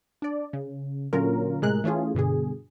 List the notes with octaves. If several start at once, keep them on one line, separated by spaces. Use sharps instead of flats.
D4 D5
C#3
A#2 D3 F#3 C#4 F4 A#4
A2 C3 G#3 G#4 A#4 F#6
E3 A3 C#4 F4 G#4
G2 B2 D3 G#4